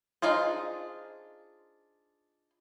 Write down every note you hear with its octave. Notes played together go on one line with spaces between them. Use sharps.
D4 D#4 F4 G#4 C5